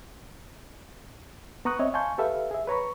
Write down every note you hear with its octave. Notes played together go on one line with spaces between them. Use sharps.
B3 A#5 C#6 D#6 F#6
C4 C#5 D#5 E5
F5 G#5 A5 C6 C#6 G6
G4 A4 B4 E5 F5
G#4 E5
B4 C#5 A#5 B5 C#6